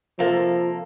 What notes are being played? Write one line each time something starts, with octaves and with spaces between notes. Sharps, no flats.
C3 F3 A#3 A4